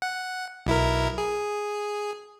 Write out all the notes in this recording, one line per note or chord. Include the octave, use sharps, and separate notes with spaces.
F#5
B1 E4 A#4
G#4